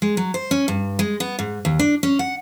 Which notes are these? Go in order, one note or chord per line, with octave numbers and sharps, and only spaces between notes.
G#3
F#3
C5
C#4
G2
G#3
B3
G#2
D#2
D4
C#4
F#5